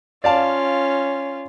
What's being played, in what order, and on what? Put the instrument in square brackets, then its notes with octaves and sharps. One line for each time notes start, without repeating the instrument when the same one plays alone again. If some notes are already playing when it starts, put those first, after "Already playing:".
[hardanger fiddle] C#4 F4 [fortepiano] D5 F5 A5